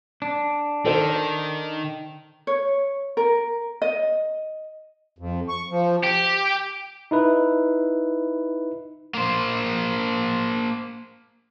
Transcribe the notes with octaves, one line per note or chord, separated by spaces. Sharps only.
D4
D#3 A4 C5
C#5
A#4
D#5
F2
C#6
F3
G4
D#4 E4 B4
A#3 C5